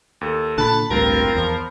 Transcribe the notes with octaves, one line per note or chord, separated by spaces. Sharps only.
D#2 A4
A#2 D3 A5 B5 F#6
A1 D2 G2 C4 F4 A#4
E2 F3